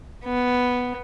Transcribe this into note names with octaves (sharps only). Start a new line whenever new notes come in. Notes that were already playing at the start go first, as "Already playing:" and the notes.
B3